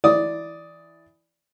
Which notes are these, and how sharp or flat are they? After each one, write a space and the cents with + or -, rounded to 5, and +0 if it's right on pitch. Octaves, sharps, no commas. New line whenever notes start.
E3 +0 D5 +0 D#6 +10